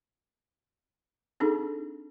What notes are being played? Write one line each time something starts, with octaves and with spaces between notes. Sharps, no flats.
C4 D4 D#4 G#4 A4